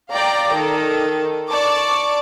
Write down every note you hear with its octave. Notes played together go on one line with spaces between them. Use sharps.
D5 F5 G5 A#5
D#3 A4
D5 A5 C#6 D6